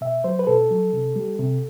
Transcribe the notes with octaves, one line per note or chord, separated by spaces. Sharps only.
B2 E5
F#3 C5
B4
B2 A4
F#3
C3
G3
C3